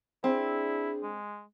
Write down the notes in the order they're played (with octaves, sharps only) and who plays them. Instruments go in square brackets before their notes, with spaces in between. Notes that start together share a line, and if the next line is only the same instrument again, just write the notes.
[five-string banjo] C4 [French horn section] D4 G#4 [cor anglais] E4
[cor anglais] G#3